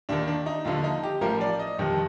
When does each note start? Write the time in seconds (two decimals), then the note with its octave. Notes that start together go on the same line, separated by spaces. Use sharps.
0.09 D#2 D#3 D4
0.27 D4
0.46 D#4
0.65 D#2 D3 F3 F4
0.84 D#4
1.03 G4
1.21 A1 A2 F3 A#4
1.41 D5
1.59 D#5
1.79 G1 F2 C3 D#3